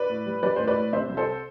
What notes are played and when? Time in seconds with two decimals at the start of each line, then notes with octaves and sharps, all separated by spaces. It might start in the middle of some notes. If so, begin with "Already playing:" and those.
Already playing: B4 D5
0.10 A2
0.26 G3
0.43 G3 B4 D5
0.56 A2 C5
0.67 B4 D5
0.75 A2
0.93 C3 C5 E5
1.09 C2
1.17 A4 C5